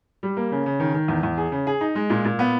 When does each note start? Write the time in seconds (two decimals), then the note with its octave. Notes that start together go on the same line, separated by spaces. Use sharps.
0.23 G3
0.37 A#3
0.52 C#3
0.66 C#3
0.80 D#3
0.95 D#3
1.08 E2
1.23 E2
1.38 G#4
1.52 C#3
1.67 G#4
1.81 D#4
1.95 G#3
2.10 A#2
2.25 A#2
2.39 B3